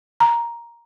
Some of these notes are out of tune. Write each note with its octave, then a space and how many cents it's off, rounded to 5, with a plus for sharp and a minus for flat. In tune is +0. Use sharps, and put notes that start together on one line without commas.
A#5 +10